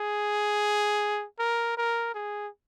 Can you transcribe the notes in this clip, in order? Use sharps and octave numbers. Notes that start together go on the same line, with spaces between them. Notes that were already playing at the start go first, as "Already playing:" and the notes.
Already playing: G#4
A#4
A#4
G#4